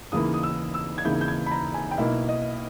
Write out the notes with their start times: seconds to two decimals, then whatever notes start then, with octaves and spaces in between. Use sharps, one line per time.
0.12 D#2 C#3 E3 A#3 E4 D#6
0.34 D#6
0.43 E6
0.74 E6
0.98 G#6
1.05 D#2 C#3 E3 A#3 E4 G6
1.21 G6
1.28 G#6
1.46 B5
1.51 A#5
1.74 G#5
1.91 G5
1.98 B1 B2 A#3 E4 E5
2.28 D#5